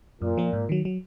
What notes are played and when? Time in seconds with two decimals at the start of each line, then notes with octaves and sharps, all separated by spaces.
0.22 F#2 A#2
0.37 F3 A#3
0.53 G#2
0.69 D#3 F#3
0.85 F#3